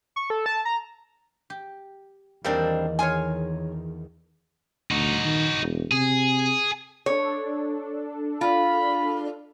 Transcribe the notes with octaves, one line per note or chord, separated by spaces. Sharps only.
C#6
A4
A5
A#5
G4
E2 D#3 G3 A#3 C4 D4 D#4
F4 G#4 C#5 G#5
D2 D#4 F#4
D#3
E1
C3 G#4
D4 A4 C#5
F4 B5